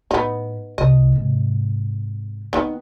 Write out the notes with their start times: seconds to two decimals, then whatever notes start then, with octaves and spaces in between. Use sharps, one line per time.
0.11 A2 B3 D#4
0.78 C2 D#5
1.12 G#2 C3
2.53 D#3 B3 C4 D#4